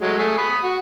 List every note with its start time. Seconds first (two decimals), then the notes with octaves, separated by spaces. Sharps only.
0.01 F#3 G#3 A3
0.19 A3 G#4
0.38 B5 D#6
0.63 F#4